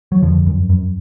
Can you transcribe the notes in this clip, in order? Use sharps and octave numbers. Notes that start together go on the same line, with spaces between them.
F#3
F2 D3 F3
F#2
F#2